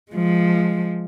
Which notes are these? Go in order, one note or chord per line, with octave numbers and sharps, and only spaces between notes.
F3 G#3